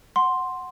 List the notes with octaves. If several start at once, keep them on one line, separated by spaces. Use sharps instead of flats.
F#5 C6